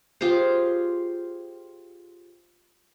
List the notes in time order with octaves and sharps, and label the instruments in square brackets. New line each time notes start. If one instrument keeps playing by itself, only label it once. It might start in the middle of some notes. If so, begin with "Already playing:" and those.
[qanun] F4 G4 G#4 C5